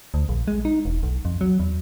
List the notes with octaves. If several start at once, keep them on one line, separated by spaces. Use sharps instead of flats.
D2
A#1
G#3
D#4
E1
B1
F2
F#3
E2